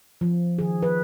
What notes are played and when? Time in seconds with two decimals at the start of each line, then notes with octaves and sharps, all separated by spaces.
0.21 F3
0.58 D#3 G#4
0.83 B4